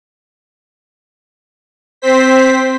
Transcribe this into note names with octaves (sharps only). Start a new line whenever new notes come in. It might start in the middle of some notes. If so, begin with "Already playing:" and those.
C4 C5 B6